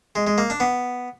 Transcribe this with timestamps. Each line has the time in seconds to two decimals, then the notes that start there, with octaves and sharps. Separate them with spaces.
0.16 G#3
0.27 G#3
0.38 A#3
0.50 D4
0.60 B3